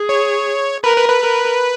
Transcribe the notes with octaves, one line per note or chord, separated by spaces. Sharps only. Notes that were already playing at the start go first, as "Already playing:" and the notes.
Already playing: G#4
C#5
A#4 B4
B4
B4
A#4